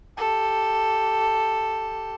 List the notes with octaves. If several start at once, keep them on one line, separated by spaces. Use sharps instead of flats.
G4 A4